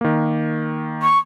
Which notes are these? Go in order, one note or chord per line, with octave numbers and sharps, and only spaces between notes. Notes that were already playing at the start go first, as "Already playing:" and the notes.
D#3 A#3
C#6